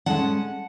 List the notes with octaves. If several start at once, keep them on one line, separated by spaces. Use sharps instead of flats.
A2 G#3 C#4 F#5 A5